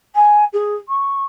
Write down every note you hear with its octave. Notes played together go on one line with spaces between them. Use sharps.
G#5
G#4
C#6